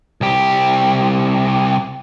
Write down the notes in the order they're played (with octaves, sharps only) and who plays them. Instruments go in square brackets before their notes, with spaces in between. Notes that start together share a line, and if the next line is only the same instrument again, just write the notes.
[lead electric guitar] C2 G4